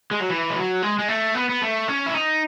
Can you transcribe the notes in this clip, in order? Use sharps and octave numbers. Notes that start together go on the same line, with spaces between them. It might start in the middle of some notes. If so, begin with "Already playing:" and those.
G#3
F#3
E3
G#3
F#3
G#3
G#3
A3
B3
B3
A3
C#4
E4
D#4